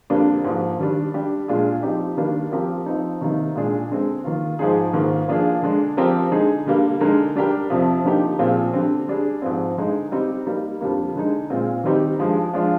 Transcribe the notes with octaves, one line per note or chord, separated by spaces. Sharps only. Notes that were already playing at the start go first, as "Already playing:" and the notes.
F2 D3 G3 A#3 D4
G#2 F3 A#3
D#3 G3 D4
G3 D4 G4
A#2 G#3 D4 F4 G#4
F3 C4 D#4 G4
D#3 G3 A#3 D4
F3 C4 G4 A#4
F3 C4 D#4
C3 D#3 A#3 D#4
A#2 G#3 D4 G#4
D3 G#3 C4
D#3 A#3 F4
G#2 F3 G#3 D#4 G#4
G#2 D#3 A#3 F4
F3 A#3 D4 F4 G#4
D3 G#3 D4
F3 C4 G4 A#4
D3 G#3 D#4 G#4
D3 G3 A#3
D3 G#3 D#4 A#4
G3 D4 G4 A#4
F2 C3 F3
D3 F3 A#3 D#4 G4
A#2 F3 C4 F4 G#4
D3 G3 C4
G3 D4 G#4
G#2 F3 C4
G2 D3 G#3 D#4
G3 C4 D#4 G4
G3 A#3 D#4
F2 D3 G3 A#3
D3 G#3 D#4
A#2 G#3 C4 F4
D#3 G3 C4 D#4 G4
G2 F3 G#3
F3 G#3 D4 F4